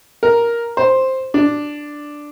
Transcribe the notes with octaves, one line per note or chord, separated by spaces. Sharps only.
A#4
C5
D4